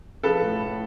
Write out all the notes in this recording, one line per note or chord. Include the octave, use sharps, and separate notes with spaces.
F3 A4 B4
A2
A2